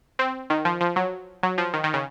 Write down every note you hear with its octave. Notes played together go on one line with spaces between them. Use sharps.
C4
D#3
F3
F3
F#3
F#3
F3
D#3
D#3
C#3